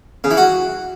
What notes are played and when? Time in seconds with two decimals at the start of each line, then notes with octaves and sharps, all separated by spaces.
0.24 C#3
0.31 E3
0.37 F#4